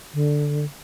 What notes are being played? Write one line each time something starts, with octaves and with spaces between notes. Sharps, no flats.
D3